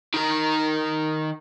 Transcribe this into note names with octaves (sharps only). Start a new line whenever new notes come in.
D#3 A#4